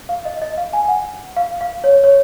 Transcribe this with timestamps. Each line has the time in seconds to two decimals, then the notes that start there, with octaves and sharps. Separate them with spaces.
0.09 F5
0.25 D#5
0.42 D#5
0.57 F5
0.73 G#5
0.88 F#5
1.37 F5
1.61 F5
1.84 C#5
2.04 C#5